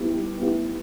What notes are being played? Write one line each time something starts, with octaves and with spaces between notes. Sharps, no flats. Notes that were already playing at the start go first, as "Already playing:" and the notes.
Already playing: B3 E4 G4
G3
B3 E4 G4